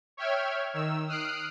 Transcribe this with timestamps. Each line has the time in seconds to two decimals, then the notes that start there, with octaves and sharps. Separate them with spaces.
0.17 C#5 E5 G5 F6 G#6
0.74 D#3 E6
1.08 D#6 F6 F#6 C7 D7